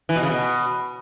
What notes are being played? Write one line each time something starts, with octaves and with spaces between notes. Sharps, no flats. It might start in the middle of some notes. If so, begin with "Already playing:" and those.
E3
B2
C#3
B2